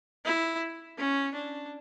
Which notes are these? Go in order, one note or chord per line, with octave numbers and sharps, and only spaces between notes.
E4
C#4
D4